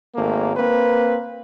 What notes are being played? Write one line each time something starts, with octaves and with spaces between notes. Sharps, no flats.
G#1 A3 A#3
A#3 C4 B4